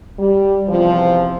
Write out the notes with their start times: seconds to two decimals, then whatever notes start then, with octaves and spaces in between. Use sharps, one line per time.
0.18 G3
0.68 E2 C3 F3